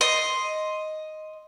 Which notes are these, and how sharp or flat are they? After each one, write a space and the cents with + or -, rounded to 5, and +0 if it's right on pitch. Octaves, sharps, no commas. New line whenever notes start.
D#5 +0 C6 +0